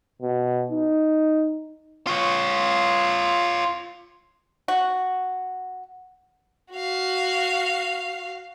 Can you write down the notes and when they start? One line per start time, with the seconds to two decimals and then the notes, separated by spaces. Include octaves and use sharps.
0.22 B2
0.71 D#4
2.07 F4 C#5
4.68 F#4
6.73 F#4 F5